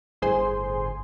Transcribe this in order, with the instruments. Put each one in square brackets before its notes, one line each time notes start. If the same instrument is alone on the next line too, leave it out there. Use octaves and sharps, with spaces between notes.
[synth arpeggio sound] G1 A2 G#4 C5 G#5 C6